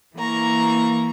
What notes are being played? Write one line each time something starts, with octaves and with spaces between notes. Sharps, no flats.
E3 A#3 A#5 C#6